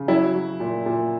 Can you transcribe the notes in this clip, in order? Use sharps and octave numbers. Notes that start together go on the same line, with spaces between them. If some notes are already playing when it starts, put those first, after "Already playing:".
Already playing: C#3
F#3 E4
F#3
A#2
A#2